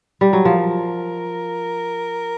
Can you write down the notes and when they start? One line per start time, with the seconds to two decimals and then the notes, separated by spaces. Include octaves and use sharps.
0.21 G3
0.33 F#3
0.45 F3 A#4